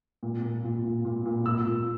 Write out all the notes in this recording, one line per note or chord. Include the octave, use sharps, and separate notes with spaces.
A#2
A#2
A#2
A#2
A#2
A#2
A#2 E6
A#2